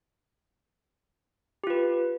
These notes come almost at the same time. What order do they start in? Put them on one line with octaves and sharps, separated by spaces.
G4 F4 B4